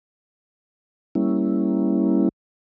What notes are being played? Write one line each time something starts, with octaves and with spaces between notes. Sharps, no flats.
G3 A#3 C#4 E4